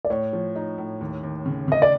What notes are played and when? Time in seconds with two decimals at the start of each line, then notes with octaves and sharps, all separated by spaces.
0.05 D5
0.10 A2 C#5
0.33 F3
0.56 D#4
0.78 A2
1.01 D#2
1.23 D#2
1.46 C#3
1.68 C#3 D#5
1.82 D5